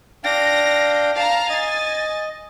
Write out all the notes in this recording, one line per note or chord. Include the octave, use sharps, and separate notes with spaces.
D4 F5 G5 A#6
F5 A5 A#5
D#5 G#5 A6